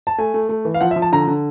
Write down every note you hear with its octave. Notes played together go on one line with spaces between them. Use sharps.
A5
A3 G#5
A3
A3
E3
F5
F3 F#5
E5
F3
A5
D3 A#5
D3